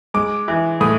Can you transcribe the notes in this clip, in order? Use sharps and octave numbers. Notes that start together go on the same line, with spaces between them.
G#3 D6
E3
A2 D#6